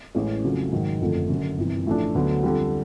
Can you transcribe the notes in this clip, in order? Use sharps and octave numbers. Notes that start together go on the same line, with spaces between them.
A1 A2 E3 G#3 C#4
F2 C#3 F#3 A3
G#2 D#3 F#3
F#1 F2 D3 F3 A3
F#1 F#2 D3
G1 F2 C3 E3
A1 A2 F3 A3 D4
D2 D3 F#3 B3
F2 D3 G3